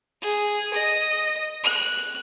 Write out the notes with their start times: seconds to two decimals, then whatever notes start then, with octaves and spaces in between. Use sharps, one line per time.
0.22 G#4
0.74 D#5
1.64 F#6